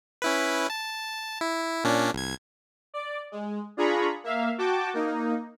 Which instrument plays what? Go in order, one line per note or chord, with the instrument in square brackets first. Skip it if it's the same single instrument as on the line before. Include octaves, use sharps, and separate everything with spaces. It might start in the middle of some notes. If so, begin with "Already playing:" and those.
[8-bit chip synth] C#4 E4 B4
A5
E4
A#2 C#4 D4
C2 G#6
[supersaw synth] D5
G#3
D4 F4 G#4 A#5 B5 C#6
A#3 E5 F5
F#4 G5 A5 D6
A#3 D#4